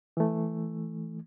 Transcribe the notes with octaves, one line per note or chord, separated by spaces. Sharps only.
E3 A3